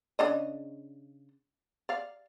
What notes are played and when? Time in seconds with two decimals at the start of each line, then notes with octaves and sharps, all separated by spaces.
0.19 C#3 D4 D#5
1.89 D5 F5